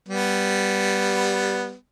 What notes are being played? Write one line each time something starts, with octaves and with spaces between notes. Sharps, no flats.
G3 B3